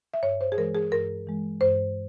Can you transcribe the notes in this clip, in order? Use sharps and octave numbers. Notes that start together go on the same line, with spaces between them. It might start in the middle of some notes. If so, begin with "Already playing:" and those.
E5
G2 C#5
C5
G#4
E3 G#3 A#4
G#4
G2 A#4
E3 G#3
G2 C5